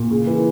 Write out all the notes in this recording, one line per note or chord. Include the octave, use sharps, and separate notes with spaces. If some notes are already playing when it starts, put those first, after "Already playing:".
Already playing: A#2
C#3
E3